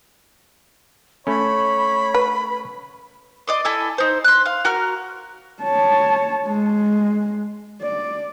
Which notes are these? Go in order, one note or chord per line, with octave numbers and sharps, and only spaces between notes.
A3 C#4 C#5 B5
B4
D5 D#5 C6
E4 A4 G#5 E6
D#4 C5
C6 F#6
F5
F#4 A#4 F6
C#5 A5
G#3
D5